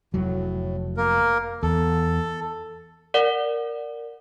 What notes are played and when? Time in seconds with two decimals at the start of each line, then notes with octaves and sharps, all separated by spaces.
0.14 F1 A2 F#3
0.97 A#3 A#4
1.63 E2 A4
3.14 A#4 D5 F#5